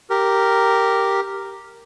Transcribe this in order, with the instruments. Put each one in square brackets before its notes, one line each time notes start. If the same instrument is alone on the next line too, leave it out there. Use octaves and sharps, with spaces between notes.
[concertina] G4 A#4